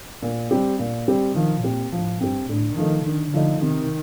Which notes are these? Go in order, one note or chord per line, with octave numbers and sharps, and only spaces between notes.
A#2
G3 C4 G4
A#2
G3 C4 G4
D#3 F3
A#2 C4 G4
A2 F3
G2 C4 G4
A2 D3
D#3 F3 A3 D#4
D3 D#3
D3 F3 A3 D#4
C3 D#3